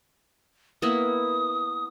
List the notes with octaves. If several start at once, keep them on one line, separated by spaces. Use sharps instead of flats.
A#3 B3 E4 D#6